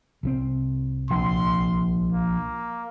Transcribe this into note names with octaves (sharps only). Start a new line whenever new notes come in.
C2 E3 C4
A#1 C6
A#3